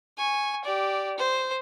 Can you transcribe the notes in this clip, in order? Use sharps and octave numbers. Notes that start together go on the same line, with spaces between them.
G#5 C#6
G4 D5
C5